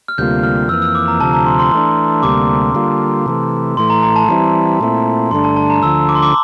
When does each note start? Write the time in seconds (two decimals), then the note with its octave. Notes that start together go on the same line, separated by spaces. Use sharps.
0.08 F6
0.18 D2 C3 G3 A#3 F4 G6
0.43 F6
0.69 F2 E3 A#3 E6
0.82 E6
0.95 D6
1.08 A#5
1.20 D2 C3 F3 A5
1.33 A#5
1.46 C6
1.59 C6
1.72 E3 A3 D4
2.23 D2 C3 G3 A#3 D6
2.75 D3 G3 A#3 F4
3.26 C3 E3 A3
3.77 A2 E3 A3 C6
3.90 A#5
4.03 A#5
4.16 A5
4.28 E3 G3 C4 E4 A#5
4.80 A#2 A3 C4 E4
5.31 G2 D3 A3 D4 C6
5.44 A5
5.56 A5
5.70 A#5
5.83 D2 D3 F3 E6
6.09 D6
6.15 C6
6.22 D6